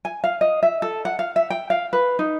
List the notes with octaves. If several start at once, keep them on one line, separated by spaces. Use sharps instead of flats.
G#5
F5
D#5
E5
A4
F#5
F5
E5
G5
F5
B4
D#4